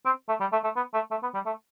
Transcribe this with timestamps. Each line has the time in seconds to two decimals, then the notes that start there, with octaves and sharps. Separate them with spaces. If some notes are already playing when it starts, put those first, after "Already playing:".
0.05 C4
0.29 A3
0.40 G3
0.52 A3
0.64 A3
0.76 B3
0.94 A3
1.11 A3
1.23 B3
1.34 G3
1.46 A3